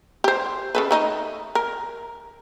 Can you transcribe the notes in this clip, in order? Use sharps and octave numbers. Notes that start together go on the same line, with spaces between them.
G4 C5
C#3 A4 B4
A3 D#4 D#5
A#4